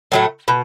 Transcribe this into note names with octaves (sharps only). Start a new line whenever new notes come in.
A2 F#3 A3
B2